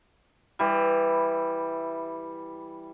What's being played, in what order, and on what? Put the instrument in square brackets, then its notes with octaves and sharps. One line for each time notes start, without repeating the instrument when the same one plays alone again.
[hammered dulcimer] E3 G3